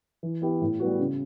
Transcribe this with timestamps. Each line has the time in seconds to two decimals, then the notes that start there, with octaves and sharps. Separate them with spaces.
0.23 E3
0.42 B3 E4 G4
0.62 A2
0.80 G3 B3 F#4
0.99 C#3